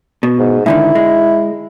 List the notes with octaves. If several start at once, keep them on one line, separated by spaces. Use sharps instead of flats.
B2
G#2
G#2 D3 D#3 E4
G#3